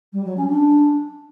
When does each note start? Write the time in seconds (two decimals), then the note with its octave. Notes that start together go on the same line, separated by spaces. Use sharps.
0.13 G3
0.25 F#3
0.37 C#4
0.49 D4